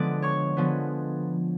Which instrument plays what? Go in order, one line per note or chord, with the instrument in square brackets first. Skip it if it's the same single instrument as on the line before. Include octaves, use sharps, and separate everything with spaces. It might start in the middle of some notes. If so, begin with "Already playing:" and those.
Already playing: [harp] D3 F3 G#3 B3 D5 D6
C#5 C#6
D3 F3 G#3 B3